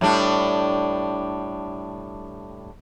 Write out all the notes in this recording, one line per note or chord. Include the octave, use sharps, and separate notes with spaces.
A2 G3 D4